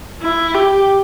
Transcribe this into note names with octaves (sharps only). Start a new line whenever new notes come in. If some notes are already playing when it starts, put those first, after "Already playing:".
E4
G4